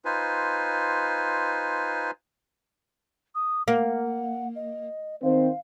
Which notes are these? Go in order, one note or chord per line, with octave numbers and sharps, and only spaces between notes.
D#4 F4 B4 C5 G#5
D#6
A#3 F#5
D#5
D#3 C4 C5 F5